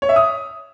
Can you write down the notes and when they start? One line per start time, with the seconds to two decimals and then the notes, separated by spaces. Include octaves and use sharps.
0.02 C#5
0.09 E5
0.16 D#6